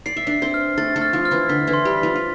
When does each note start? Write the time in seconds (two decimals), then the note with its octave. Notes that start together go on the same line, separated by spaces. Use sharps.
0.06 D5 C7
0.17 E5
0.27 D4 D5 C7
0.42 C4 C5
0.54 F6
0.78 A3 A4 A6
0.96 A3 A4
1.02 F6
1.13 F3 F4
1.25 F6
1.31 E3 E4
1.49 D3 D4 B6
1.67 E3 E4
1.73 C6
1.85 G3 G4
1.97 B6
2.03 F3 F4
2.16 F4